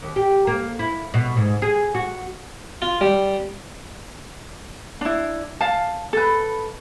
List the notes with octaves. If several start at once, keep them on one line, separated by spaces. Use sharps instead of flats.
D#2
G4
A#3
E4
B2
G#2
G#4
F#4
F4
G3
D4 E4
F5 A5
A4 B4